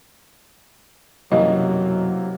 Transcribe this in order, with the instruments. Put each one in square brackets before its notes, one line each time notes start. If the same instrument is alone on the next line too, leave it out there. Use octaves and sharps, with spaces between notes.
[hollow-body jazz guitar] B1 F#2 [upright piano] C3 E3 A#3 [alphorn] F#3 [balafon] D#5